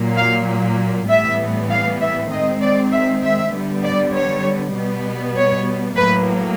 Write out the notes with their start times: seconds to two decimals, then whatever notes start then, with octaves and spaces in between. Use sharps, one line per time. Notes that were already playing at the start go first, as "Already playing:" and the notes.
Already playing: A#2 F#3 A#3
0.17 F5
1.09 A2 E3 G3 B3 E5
1.70 F5
2.01 E5
2.32 D#3 G#3 C4 D#5
2.62 D5
2.92 E5
3.23 E5
3.53 D3 G3 B3
3.84 D5
4.14 C#5
4.75 B2 G3 B3
5.36 C#5
5.97 A2 F#3 A#3 B4